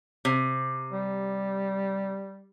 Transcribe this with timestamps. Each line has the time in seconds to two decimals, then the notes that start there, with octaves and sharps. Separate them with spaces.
0.25 C3
0.92 G3